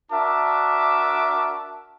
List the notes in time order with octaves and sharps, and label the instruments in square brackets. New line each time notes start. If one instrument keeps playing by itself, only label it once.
[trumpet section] D4 F#4 A#4 E5 A5 D6